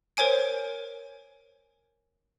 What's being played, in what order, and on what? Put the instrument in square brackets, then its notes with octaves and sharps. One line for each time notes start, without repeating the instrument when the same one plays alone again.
[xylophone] A#4 C5 C#5 G#5 D7